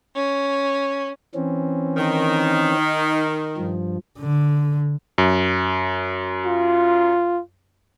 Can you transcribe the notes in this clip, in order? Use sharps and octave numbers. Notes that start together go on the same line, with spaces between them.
C#4
E3 C4 C#4
D#3
D#4
G2 F3
D3
F#2
F4